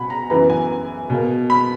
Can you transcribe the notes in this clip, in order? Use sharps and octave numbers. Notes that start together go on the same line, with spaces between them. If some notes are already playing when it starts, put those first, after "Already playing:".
Already playing: B2 F#5 G#5 B5
A#5
F#2 E3 B3 A#5
G#5
B2 A#3
B5